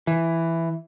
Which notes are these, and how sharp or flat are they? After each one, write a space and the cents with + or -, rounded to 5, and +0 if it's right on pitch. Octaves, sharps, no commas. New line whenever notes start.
E3 +5